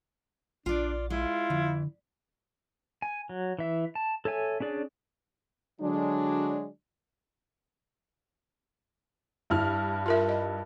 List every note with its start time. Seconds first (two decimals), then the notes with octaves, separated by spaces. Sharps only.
0.66 A#1 D4 F4 D5
1.10 G#3 E4 F4
1.50 F2 D3
3.02 G#5
3.29 F#3
3.59 E3 E5
3.95 A5
4.25 A4 C#5 E5 G#5
4.60 C#4 D4 G#4 D5
5.81 D3 F#3 G#3 D4
9.50 G2 E4 F6
10.06 F4 A#4 E5
10.29 D#5